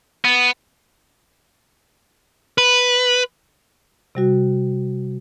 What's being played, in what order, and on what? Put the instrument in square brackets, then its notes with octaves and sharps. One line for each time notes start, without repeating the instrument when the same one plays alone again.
[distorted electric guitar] B3
[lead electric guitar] B4
[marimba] C3 G3 F#4